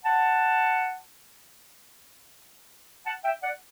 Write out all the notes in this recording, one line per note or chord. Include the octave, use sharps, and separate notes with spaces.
F#5 A5
F#5 A5
E5 G5
D5 F#5